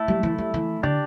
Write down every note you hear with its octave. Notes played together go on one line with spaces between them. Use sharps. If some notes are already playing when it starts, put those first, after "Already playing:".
Already playing: A3 E4 A4
G3
E3
G3
E3
D3 D4 G4 D5